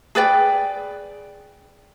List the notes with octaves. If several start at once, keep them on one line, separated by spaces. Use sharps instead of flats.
G#4 B4 D5 G5